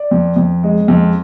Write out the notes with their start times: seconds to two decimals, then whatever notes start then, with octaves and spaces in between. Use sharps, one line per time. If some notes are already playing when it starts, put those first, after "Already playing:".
Already playing: D5
0.11 F2
0.37 F2
0.63 G#3
0.88 F2